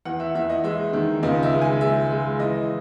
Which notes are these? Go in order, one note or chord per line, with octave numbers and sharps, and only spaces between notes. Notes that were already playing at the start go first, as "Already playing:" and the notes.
E2 F#5
E5
E2 E5
D#5
G#3 E5
D#3
C#2 D#5
E5
G#3
G#5
G#3 E5
G#3
E3 D#5